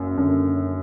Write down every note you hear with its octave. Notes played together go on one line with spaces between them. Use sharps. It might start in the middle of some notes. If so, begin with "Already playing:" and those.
Already playing: F#1 F#2
F#1 F#2 D3